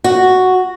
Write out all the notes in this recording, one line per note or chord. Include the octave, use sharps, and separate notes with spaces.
F#4